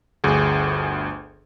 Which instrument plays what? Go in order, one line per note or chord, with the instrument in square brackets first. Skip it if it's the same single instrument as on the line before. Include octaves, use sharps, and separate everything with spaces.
[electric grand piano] G1 D2 G#4